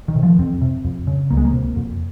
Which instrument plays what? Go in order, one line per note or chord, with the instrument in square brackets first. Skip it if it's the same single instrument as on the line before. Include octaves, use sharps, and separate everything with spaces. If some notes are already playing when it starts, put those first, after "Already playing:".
[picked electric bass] D#3
C3
F3
F2 C4
C3
F2
C#3
C#2 A#3
G#3
A#3
C3
F2